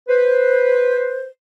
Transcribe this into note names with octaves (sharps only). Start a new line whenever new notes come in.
B4 C5